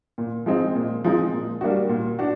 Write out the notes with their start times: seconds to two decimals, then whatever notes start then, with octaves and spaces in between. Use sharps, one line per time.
0.18 A#2
0.46 F3 G#3 C4 D#4
0.75 A#2
1.04 F3 G#3 C4 D#4
1.33 A#2
1.61 G3 A#3 D4 F#4
1.89 A#2
2.19 D4 F#4